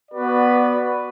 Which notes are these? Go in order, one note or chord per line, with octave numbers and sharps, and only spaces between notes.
B3 F#4 B4 D5